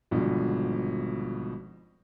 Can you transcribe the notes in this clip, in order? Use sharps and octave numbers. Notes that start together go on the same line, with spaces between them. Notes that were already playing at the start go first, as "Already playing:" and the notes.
G#1 G2 B2 D3 F3